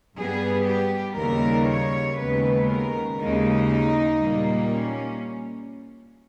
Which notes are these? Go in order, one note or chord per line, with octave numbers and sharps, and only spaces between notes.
G2 G3 B3 G#4
G4
D#2 C#3 G3 A#4
C#5
D#2 C#3 G#3 B3 B4
A#4
D#2 C#3 G#3 D#4
A#2 G3 A#3
C#4